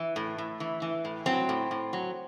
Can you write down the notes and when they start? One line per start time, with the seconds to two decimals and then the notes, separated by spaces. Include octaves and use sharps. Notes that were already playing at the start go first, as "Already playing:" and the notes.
Already playing: E3
0.16 A2
0.38 A2
0.60 E3
0.82 E3
1.05 A2
1.26 F#3 C4
1.49 A2
1.71 A2
1.93 F#3